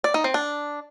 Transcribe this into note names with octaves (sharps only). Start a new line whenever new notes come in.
D5
D#4
C4
D4